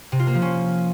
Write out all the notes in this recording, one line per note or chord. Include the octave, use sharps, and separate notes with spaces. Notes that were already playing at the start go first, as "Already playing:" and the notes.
C3
F4
A#3
F3
C#4